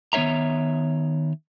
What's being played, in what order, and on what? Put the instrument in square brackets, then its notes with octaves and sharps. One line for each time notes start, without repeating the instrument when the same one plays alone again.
[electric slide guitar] D#3 B3 E4 C#5 E5 A#5